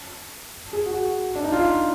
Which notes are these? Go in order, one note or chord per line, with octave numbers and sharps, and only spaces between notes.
G#4
F#4
D4
D#4
F4